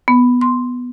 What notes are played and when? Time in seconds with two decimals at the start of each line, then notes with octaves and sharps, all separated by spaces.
0.08 B3
0.41 C6